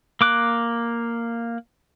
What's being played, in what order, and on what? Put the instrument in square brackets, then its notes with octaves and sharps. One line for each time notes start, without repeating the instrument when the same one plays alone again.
[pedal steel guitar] A#3 D6 F#6